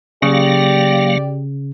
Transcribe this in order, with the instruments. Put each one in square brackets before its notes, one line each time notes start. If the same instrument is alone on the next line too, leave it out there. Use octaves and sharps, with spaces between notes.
[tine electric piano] C#3 [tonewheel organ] F#3 A#3 F5 [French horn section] G4 D5